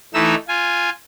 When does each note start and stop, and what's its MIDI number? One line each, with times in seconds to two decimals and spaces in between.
0.14 0.35 52
0.14 0.35 57
0.14 0.35 63
0.14 0.35 88
0.48 0.90 65
0.48 0.90 80